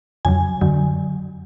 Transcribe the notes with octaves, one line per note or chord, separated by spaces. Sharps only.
F2 C#3 F#3 G#5
F#2 D3 F#3